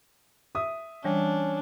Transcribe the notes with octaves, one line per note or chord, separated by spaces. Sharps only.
E5 D#6
E3 G3 C#4 D4